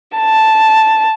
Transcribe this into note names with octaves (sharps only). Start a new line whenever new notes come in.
A5